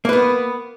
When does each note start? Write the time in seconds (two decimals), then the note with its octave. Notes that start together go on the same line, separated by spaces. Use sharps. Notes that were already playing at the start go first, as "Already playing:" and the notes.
0.05 A#3
0.09 B4
0.13 B3